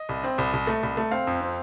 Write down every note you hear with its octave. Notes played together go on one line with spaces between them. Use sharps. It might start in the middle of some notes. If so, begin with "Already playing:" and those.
Already playing: D#5
C2
C4
C2
C2
A3
C2
A3
C4 F5
F2
C4